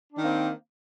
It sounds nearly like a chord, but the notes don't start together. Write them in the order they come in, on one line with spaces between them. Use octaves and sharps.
D4 D#3 A#3 C4